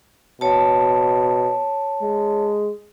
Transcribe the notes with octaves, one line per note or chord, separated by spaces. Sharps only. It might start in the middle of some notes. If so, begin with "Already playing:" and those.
B2 C#5 A5
G#3